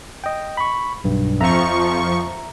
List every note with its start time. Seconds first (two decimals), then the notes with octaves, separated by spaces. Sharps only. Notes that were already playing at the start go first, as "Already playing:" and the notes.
0.24 D#5 G5
0.57 B5 C#6
1.04 B1 G2
1.41 F2 F3 E5 A#5 C#6